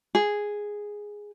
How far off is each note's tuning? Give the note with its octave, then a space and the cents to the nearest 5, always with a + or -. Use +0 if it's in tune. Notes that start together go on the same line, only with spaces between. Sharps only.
G#4 -5